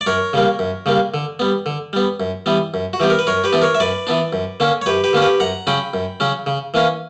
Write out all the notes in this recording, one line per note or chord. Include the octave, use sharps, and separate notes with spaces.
D5
F#2 A#4 C#5
C#3 G3 A#3
F#2
C#3 G3 A#3
D3
G3 B3
D3
G3 B3
F#2
E3 G3 B3
F#2
F#4
E3 G3 B3 G4
A#4
B4
F#2 A#4 C#5
G4 B4
E3 B3 D4
A#4 C#5
E5
F#2 B4 D5
E3 B3 D4
F#2
D3 A#3 C#4
C#5
F#2 G4 B4
G4 B4
D3 A#3 C#4
G4 B4
F#2 F#5 A#5
C#3 F#3 C#4 G5 B5
F#2
C#3 F#3 C#4
C#3
E3 A#3 C#4